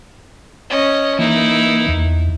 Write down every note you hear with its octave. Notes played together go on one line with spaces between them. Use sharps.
C#4 D#5
E3 A#3 D#4 E4
E2